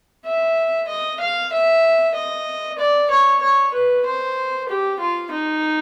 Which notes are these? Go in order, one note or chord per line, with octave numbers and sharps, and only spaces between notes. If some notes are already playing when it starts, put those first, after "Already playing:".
E5
D#5
F5
E5
D#5
D5
C#5
C#5
B4
C5
G4
F4
D#4